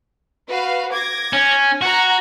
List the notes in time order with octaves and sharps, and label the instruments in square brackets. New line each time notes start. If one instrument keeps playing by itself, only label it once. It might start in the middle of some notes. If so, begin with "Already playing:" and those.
[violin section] F#4 B4 F5
D6 G#6 A#6
[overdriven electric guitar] C#4
[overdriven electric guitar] F#4 [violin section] F#5 A#5